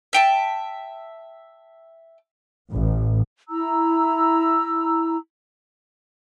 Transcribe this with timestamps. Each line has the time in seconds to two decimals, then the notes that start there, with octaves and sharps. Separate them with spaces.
0.13 E5 G5 A5
2.71 A1
3.49 E4 A#5 E6